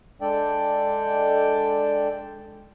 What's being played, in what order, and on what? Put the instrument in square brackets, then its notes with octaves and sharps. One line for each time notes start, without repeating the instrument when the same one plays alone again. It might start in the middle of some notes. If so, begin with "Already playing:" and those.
[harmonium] G#3 D4 A4 D5 G5